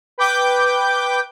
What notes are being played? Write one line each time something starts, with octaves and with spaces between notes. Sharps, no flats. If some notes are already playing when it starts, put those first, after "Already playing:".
B4 G5 D6 G6